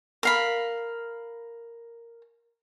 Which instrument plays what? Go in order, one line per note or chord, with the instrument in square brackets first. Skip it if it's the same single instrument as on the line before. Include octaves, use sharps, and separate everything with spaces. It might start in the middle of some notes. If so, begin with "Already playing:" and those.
[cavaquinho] A#4 F5 B5